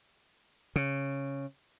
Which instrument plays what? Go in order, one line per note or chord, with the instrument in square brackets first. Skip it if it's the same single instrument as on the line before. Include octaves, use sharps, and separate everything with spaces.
[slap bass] C#3